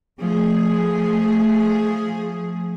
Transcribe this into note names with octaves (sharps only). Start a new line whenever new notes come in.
F3 A3 G#4